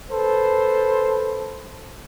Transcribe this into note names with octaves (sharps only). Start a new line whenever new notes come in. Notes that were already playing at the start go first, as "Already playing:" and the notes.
A4 B4 C5